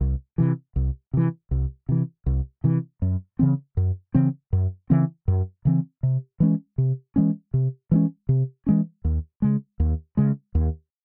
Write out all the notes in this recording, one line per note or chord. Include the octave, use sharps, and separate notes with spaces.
C2
C3 E3
C2
C3 E3
C2
C3 E3
C2
C3 E3
F#2
C#3 E3 C4
F#2
C#3 E3 C4
F#2
C#3 E3 C4
F#2
C#3 E3 C4
C3
E3 G#3 C#4
C3
E3 G#3 C#4
C3
E3 G#3 C#4
C3
E3 G#3 C#4
D#2
C#3 G#3
D#2
C#3 G#3
D#2